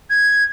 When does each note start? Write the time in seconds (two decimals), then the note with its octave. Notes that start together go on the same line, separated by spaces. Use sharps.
0.10 G#6